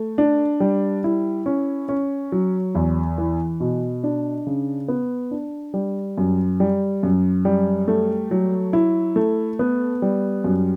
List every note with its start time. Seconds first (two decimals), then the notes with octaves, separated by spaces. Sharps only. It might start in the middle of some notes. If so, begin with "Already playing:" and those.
Already playing: A3
0.18 D4
0.60 G3
1.04 E4
1.46 C#4
1.89 C#4
2.32 F#3
2.75 E2
3.18 E3
3.60 B2
4.04 D4
4.47 C#3
4.88 B3
5.31 D4
5.74 G3
6.18 F#2
6.60 G3
7.03 F#2
7.45 G3
7.88 A3
8.31 F#3
8.73 E4
9.16 A3
9.59 B3
10.02 G3
10.44 F#2